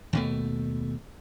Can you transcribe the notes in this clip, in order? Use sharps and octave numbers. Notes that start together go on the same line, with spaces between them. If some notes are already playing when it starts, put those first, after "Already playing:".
D#2 B2 A3